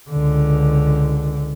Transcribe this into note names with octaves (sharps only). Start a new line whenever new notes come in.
C#2 D3